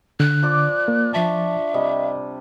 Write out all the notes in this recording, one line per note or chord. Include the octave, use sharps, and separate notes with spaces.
D3 F#6
F3 D5 D6
A#3
F3 D4 E5 A5 C#6
C3 G3 D#5